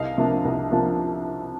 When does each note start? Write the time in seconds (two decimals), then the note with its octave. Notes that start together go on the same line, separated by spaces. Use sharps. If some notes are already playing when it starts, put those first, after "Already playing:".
Already playing: C2 D#5 F5
0.18 C3 F3 A#3 D4
0.45 C2
0.71 C3 F3 A#3 D4